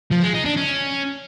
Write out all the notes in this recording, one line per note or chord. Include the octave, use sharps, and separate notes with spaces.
F3
G#3
D#4
D4
C#4